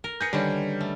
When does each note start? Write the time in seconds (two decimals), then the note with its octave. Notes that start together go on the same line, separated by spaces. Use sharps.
0.04 A#4
0.21 G#4 B4 G6 A#6 C#7
0.33 D3 D#3 G3 C#4
0.81 A3